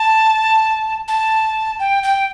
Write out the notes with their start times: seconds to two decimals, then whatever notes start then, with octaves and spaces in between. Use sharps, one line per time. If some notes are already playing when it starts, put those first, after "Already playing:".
Already playing: A5
1.08 A5
1.80 G5
2.03 G5